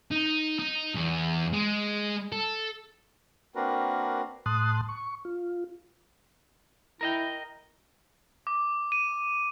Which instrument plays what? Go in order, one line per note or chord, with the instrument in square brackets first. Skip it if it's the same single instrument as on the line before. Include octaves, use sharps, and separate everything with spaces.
[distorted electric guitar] D#4
D#4
E2
G#3
A4
[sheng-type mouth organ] A#3 C4 D4 F#4 A#4 B4
[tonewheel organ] A2 A5 C6 D#6 F#6
C#6
F4
[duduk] E4 [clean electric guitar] A#4 D#5 G5
[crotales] D6
D#7